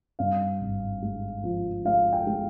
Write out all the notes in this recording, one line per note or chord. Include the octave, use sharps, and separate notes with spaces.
G2 F5
G#1
G#3
F3
G#3 F5
G5
G#3